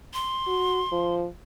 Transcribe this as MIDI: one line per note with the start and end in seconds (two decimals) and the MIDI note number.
0.14 1.14 84
0.47 0.82 66
0.92 1.26 53